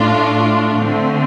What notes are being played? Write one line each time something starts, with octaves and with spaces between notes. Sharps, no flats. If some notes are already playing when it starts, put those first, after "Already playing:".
Already playing: A2 A3 D4 F4
D3 A3 C4